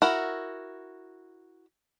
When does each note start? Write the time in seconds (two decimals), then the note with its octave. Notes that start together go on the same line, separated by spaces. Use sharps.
0.02 E4 F#4 A#4